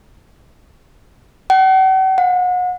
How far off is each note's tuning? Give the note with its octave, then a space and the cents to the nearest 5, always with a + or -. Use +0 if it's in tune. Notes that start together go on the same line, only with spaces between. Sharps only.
F#5 +45
F#5 -35